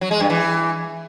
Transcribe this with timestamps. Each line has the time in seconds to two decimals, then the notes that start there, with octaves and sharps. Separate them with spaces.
0.01 F#3
0.11 G#3
0.20 G2
0.30 E3